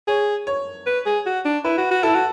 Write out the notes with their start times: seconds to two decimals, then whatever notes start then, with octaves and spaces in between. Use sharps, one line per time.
0.08 G#4 C#5
0.47 C#5
0.86 B4
1.06 G#4
1.26 F#4
1.45 D4
1.65 E4 B4
1.78 F#4
1.91 F#4
2.03 E4 A4
2.15 F#4